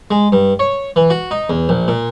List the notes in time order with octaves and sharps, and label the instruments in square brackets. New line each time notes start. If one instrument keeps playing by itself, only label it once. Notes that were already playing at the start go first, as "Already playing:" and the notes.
[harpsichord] G#3
G2
C#5
E3
F#4
D#4
E2
A#1
A#2